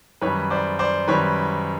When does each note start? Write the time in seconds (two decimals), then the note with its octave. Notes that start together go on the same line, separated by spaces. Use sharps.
0.21 F#2 D#3 G3 B4 C#5
0.50 C5 D5
0.79 C5 D5
1.08 F#2 D#3 G3 B4 C#5